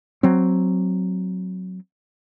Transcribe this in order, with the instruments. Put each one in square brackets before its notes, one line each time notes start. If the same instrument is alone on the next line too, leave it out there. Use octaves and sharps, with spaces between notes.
[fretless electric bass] F#3 C4